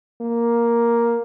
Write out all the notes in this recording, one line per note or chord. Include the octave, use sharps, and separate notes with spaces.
A#3